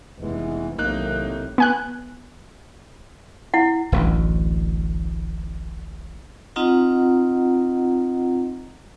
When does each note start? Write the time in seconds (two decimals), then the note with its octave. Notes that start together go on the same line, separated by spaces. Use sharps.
0.18 F1 B2 E3 G#3
0.78 B1 A2 C3 D#3 A#3 D#4 F#6
1.58 B3 G#5 F#6
3.54 E4 F#5
3.92 D1 A1 D2
6.56 C4 D#4 F4 D#5 F#5 A#5